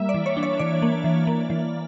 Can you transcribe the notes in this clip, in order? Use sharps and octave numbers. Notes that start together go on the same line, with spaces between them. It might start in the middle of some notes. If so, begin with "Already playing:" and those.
Already playing: G3 A#3 E5
D5
E3
C#5
D4
C#5
E3 D5
A#3
E3
A#3
E3